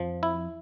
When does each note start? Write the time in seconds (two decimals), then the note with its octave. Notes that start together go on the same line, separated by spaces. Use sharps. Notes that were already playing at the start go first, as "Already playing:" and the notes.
Already playing: F2 F3
0.23 E4